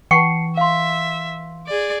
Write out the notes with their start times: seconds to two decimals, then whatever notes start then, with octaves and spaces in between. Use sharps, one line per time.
0.11 E3 F#5 G5 A5 C#6 C7 C#7
0.57 E5 F5 C6
1.67 G#4 D5